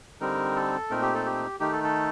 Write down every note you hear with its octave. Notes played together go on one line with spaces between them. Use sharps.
D3 G3 C4 D#4 A#4
A4
A#2 A3 C4 D#4 A#4
G4
A4
G4
D#3 A3 D#4 G4
A4
A4